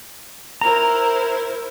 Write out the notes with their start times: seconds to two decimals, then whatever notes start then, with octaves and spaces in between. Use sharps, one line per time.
0.61 E4 A#4 C5 A#5